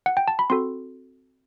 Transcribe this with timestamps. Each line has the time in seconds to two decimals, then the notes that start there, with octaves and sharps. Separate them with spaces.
0.06 F#5
0.17 G5
0.28 A5
0.39 B5
0.50 C4 F#4 A4 C6